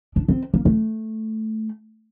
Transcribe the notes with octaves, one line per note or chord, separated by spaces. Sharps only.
D4
C4
A#3
A3